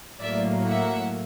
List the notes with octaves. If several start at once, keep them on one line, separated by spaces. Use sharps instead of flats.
A2 F#3 A#3 D5 E5
E5 F#5